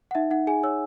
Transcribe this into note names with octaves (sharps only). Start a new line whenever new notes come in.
F#5
D#4 E5
D#4 F#5
G#4 G#5
C#5 E6